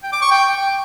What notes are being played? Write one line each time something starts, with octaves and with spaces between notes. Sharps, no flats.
G5
D6
C#6
G5